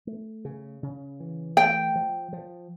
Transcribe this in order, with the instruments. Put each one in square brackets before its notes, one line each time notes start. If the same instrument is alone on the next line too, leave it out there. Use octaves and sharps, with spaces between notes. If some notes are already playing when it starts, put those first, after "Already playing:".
[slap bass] A3
C#3
C#3
E3
[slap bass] A3 [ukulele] G5
[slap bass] F3
F3